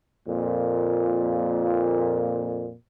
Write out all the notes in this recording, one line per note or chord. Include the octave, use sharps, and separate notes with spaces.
F2 A#2